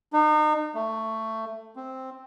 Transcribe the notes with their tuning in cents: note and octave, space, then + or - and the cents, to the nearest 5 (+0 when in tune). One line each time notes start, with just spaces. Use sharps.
D#4 -35
A3 +15
C4 +0